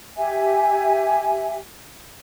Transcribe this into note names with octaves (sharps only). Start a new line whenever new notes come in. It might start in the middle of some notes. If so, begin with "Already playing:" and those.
G4 E5 G#5